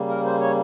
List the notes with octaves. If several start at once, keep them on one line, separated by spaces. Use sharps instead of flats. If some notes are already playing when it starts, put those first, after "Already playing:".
Already playing: C#3 G3 A#3
A#4
C5
C#5